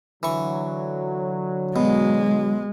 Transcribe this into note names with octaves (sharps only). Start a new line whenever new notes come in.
D3 E3 F#3 C#6
B2 G#3